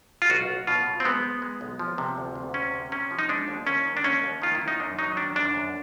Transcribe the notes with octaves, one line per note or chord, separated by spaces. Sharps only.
F4
B1 F#4
B1
B2 F4
B2
C4
G#3 B3
G#3
G#3
B1
F3
C3
D2
D2
C3 C#4
C3
C3 C#4
F3
D#4
G#3 D4
D#2
D#2 C#4
D#3
D4
D#2 C#4
D#2
D#3 F4
E4
D#3
D#4
F#2 D4
F#3 D#4
D#3 D4
F#2 D4
F#2